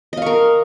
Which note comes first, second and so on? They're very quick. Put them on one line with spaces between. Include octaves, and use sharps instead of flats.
D#5 F5 C#6 A#4